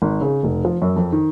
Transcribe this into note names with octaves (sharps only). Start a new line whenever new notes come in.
G#1
C#3
F1
F3
F#2
F2
D#3